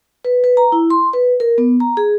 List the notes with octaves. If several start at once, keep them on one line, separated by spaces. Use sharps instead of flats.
B4
B4
A#5
E4
C6
B4
A#4
B3
A#5
G#4